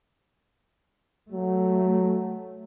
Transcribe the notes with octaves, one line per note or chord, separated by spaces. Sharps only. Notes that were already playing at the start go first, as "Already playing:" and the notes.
F#3 A3